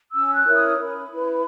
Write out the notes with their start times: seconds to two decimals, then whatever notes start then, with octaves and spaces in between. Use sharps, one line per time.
0.12 C#4 E6
0.33 F#6
0.44 E4 A#4 C#5
0.55 D#6
0.76 C#4 B5
1.08 E4 B4